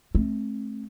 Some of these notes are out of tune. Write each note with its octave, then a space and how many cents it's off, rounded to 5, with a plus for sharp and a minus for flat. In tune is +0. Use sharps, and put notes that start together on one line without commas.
A3 -25 C4 +30